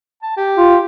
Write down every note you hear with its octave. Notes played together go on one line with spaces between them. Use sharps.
A5
G4
F4